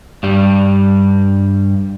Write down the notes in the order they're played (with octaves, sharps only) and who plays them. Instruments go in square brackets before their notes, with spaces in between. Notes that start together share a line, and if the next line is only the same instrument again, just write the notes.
[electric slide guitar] G2 G3